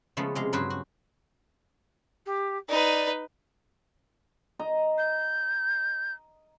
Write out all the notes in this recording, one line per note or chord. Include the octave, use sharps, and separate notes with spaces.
C#3 F3 G#3 A3 B3
C3 G#3 F5
G2 C#3 F#3 B4 C5 G#5
F#4
G4
D#4 B4 D5
D#5 A#5
G6